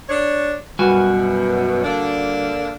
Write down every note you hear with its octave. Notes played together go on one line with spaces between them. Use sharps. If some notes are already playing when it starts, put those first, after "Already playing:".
D4 C#5
F#2 B2 G3 F#4 G#5
D3 A#3 D4